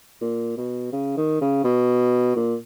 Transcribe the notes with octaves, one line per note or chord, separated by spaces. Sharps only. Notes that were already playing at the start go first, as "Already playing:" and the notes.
A#2
B2
C#3
D#3
C#3
B2
A#2